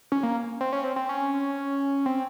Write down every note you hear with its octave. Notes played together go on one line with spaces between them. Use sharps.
C#4
A#3
C4
C#4
C4
C4
C#4
C4